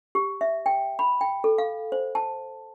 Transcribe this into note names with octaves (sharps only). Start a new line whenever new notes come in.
G4
E5
G5
B5
G5
A4
F5
C5
A5